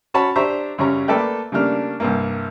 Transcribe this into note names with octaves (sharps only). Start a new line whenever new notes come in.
C#4 F#4 C#5 A5 B5
D4 G4 C5 E5 A#5 C#6
F#2 C#3 G3 C#5 A#5
A3 A#3 A4 B4 D5 G5
C#3 G3 A3 A#3 D4 F6
C2 G2 A#3